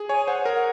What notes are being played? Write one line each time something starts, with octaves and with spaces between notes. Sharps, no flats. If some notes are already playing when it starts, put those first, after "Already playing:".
Already playing: G#4
C#5 G#5
C5 F#5
A#4
F#5